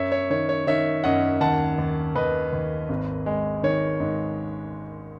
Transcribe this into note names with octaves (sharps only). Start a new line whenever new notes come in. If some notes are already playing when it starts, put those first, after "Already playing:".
Already playing: F#2 C#5 E5
C#5
D#3 C#5
C#5
D#3 C#5 E5
F#2 D#5 F#5
D#2 F#5 A5
D#2
D#2 B4 D#5
D#2
G#1
G#3
D#3 C#5
G#2